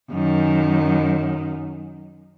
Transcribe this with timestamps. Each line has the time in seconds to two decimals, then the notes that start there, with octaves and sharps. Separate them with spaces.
0.10 F#2 D#3